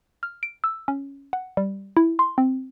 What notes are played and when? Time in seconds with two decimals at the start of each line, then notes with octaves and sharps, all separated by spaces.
0.23 F6
0.43 D7
0.64 E6
0.88 C#4
1.33 F#5
1.57 G3
1.97 E4
2.19 C6
2.38 C4